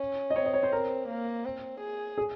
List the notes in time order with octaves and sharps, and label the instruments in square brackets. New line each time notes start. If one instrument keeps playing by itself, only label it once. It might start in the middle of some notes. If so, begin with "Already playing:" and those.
Already playing: [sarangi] C#4
[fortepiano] D#5
[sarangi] C4 [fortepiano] C#5
[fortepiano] D#5
C#5
C5
A#4
[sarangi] A#3
C4
G#4
[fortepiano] G#4